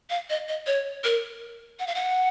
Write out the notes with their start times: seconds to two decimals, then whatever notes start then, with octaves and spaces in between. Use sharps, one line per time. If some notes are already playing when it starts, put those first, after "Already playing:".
0.10 F5
0.30 D#5
0.48 D#5
0.67 C#5
1.04 A#4
1.79 F#5
1.87 F5
1.95 F#5